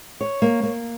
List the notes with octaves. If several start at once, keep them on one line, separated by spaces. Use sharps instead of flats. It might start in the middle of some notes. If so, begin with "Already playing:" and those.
C#5
A#3
A#3